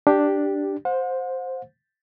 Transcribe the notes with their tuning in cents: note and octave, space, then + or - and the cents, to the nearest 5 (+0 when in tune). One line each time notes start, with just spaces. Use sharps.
D4 +0 G4 +0
C5 +0 F#5 -45